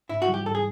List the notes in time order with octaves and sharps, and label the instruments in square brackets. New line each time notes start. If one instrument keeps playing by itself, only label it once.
[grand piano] G#2 [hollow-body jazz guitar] E4
[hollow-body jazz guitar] F#4
[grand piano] E3 G3
[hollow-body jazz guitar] G4
[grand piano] G#2 [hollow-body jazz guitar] A4
[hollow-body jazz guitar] G#4